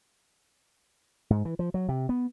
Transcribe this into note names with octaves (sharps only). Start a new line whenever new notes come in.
G#2
E3
F3
F#3
C3
B3